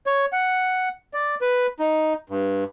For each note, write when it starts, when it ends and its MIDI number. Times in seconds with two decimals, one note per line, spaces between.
0.06 0.26 73
0.33 0.89 78
1.14 1.35 74
1.41 1.67 71
1.79 2.13 63
2.30 2.64 43